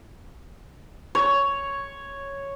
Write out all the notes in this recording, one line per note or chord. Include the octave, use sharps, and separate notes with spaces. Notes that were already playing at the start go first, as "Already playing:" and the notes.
C#5